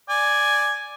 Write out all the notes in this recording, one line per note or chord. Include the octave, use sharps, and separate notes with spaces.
D5 G#5